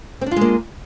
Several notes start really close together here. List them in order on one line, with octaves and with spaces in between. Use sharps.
C4 D4 F4 G#3 A#3